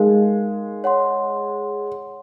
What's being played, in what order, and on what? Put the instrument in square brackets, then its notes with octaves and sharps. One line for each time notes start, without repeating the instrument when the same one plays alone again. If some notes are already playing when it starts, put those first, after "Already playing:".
Already playing: [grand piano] G#3 [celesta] D#4 A#4 F5
[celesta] C#5 F#5 C6